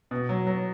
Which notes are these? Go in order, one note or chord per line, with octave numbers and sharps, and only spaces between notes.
B2
F#3
F#3